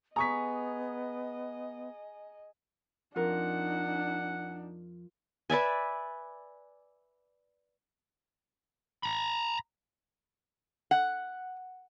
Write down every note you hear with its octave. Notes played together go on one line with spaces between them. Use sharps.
B3 G#4 D#5 A#5 C#6 B6
F2 D4 D#4 F4 A#4 F#5
B4 D5 E5 G#5
A#5 B5
F#5